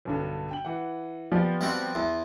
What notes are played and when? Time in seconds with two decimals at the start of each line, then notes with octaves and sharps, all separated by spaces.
0.05 B1 G2 D3
0.51 G5 F#7
0.65 E3 F#5
1.32 F3 B3 G4 D5
1.61 G3 C4 F#4
1.95 E2 C6